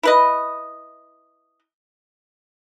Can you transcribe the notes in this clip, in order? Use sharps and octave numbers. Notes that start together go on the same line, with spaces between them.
E4 B4 D#5